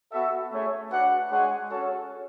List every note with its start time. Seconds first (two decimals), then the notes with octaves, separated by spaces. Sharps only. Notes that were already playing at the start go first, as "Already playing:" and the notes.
0.12 B3 F#4 A4 E5
0.52 A3 C#4 G#4 C#5 E5
0.92 D4 F#4 B4 F#5
1.31 G#3 D4 G#4 C#5 F#5
1.71 C#4 F#4 A4 C#5